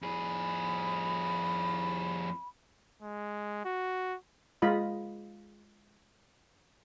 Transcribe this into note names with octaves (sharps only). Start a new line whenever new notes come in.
F2 G#4 B5
G#3
F#4
G#3 F4 D#5 B5